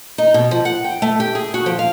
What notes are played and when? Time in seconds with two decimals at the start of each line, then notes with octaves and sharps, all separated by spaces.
0.18 D#4
0.34 B2
0.51 F3
0.65 F#5
0.84 G5
1.02 A3
1.20 G4
1.35 G#4
1.54 F#4
1.66 F3
1.79 F5